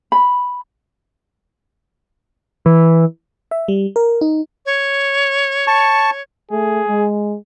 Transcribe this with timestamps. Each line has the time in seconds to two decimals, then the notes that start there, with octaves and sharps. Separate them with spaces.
0.12 B5
2.66 E3
3.51 E5
3.68 G3
3.96 A#4
4.21 D#4
4.66 C#5
5.67 A5 C#6
6.51 A3 G#4
6.88 G#3